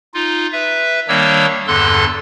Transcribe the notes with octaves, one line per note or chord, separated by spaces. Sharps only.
D#4 F4
B4 E5
D#3 G3 A#3 D4 C#5 E6
E2 G2 D3 A4 C6 F#6